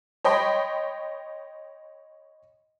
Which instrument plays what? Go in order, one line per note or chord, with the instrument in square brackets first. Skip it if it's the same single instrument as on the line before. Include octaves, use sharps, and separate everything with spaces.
[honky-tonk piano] C#5 D#5 G5 B5 C6